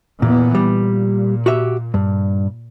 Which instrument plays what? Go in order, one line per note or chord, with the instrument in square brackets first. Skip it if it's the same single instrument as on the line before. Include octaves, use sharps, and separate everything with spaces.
[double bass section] E2 E3 B3 [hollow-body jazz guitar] A#2
[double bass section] A#2 [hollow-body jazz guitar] G3
[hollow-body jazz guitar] F#4 G4 E5
G2